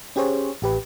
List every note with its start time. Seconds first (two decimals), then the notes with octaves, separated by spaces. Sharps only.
0.16 C#4 G4 G#4 C5 C#5
0.62 A1 G4 B4